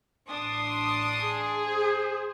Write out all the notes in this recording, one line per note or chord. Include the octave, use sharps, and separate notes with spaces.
A1 D4 C6 D#6
G#4
C5